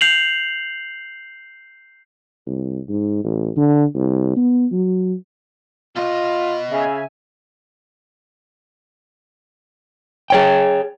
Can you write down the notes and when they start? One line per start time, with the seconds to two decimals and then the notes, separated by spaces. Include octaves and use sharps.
0.01 G6 C7 F7 F#7
2.46 C2
2.89 G#2
3.24 A1
3.57 D3
3.94 C2
4.36 B3
4.71 F#3
5.96 B2 F4 D#5
6.71 C#3 E5 G#5
10.30 G#4 C#5 G5